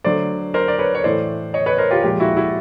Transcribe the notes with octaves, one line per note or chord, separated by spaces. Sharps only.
D3 F#3 A3 C5 D5
A#4 C5
D5
B4 C#5
C#5
A2 E3 A3 C5 D5
C#5 D#5
B4 C#5
A#4 C5
F4 G4
A#2 F3 G#3 F4 G4
E4 F#4
E4 F#4